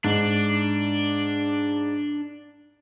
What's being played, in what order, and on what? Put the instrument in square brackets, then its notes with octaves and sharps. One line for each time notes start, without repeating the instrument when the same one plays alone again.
[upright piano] G#2 [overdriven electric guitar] D4